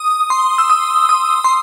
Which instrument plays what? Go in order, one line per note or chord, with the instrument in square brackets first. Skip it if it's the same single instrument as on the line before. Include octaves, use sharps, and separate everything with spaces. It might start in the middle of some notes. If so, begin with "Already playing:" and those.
Already playing: [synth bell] D#6
C6
E6
D#6
D#6
C6